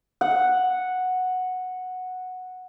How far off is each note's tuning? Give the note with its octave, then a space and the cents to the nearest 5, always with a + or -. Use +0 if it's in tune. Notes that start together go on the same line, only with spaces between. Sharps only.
F#5 -5